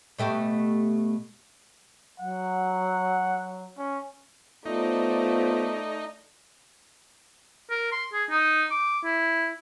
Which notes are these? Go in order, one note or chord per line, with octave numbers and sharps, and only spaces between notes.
B2 A3 G4
F#3 F#5
C#4
A3 B3 D#4 F4 C5 D5
A#4
C6
G#4
D#4
D6
E4